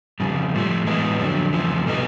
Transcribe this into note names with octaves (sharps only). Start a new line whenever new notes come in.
F2 C#3 G3
A2 F3 A3
A2 E3 G#3 B3 D#4
F2 D3 F#3
E2 C#3 F3 A3
B2 G3 B3 D#4